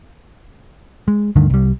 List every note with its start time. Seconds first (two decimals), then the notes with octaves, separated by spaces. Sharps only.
1.08 G#3
1.36 D2 G2 D3 D#3
1.50 C2 G3